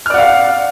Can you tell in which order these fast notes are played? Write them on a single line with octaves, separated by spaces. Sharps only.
F6 D5 F#5 F5